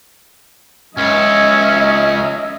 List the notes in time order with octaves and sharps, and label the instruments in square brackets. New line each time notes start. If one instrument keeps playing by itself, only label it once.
[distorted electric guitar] C#2 [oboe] C#4 [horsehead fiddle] D#5 E5